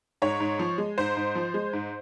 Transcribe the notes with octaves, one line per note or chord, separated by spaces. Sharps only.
G#2 C#5
G#2
F3
G#3
G#2 C5
G#2
F3
G#3
G#2